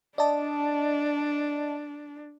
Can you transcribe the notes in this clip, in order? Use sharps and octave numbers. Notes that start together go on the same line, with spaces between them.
D4 D5 D#5 A5